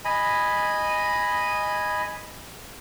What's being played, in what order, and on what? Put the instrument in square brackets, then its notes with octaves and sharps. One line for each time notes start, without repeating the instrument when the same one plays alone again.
[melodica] D#5 G#5 B5